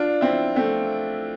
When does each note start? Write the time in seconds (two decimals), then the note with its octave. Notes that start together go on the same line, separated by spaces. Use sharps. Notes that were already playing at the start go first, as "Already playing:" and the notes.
Already playing: D4 F4
0.21 C4 E4
0.56 A3 C4